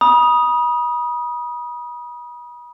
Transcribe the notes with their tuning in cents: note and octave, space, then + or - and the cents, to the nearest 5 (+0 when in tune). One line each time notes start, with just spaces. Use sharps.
B5 -40 D#6 +0